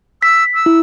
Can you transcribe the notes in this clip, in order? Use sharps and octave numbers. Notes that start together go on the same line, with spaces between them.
E6 B6
E6
E4